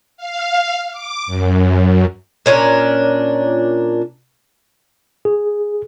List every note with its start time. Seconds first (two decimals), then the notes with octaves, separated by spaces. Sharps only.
0.17 F5
0.91 D6
1.27 F#2
2.46 A#2 C#4 D4 A#4
5.25 G#4